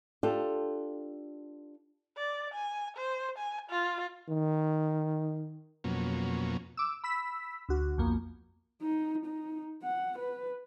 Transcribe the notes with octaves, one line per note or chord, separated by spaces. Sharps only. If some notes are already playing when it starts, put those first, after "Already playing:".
D4 F4 G4 A4
D5
G#5
C5
G#5
F4
D#3
F2 B2 F#3 A#3 C#4
D6 E6
B5 E6 B6
D2 F#4
B1 F2 A#3
D#4
D#4
F#5
B4